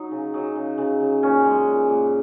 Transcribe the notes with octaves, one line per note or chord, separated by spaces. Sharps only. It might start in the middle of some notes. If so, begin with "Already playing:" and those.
Already playing: F#3 D#4
C#3
F#3 D#4
C#3
C#3
C#3
A#2 C#4
G#3
A#2
A#2